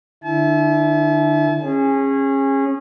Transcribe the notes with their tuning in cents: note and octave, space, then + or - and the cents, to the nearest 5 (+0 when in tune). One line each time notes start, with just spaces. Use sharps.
D3 +35 E4 +0 A5 -45
C#4 -25 G#4 -20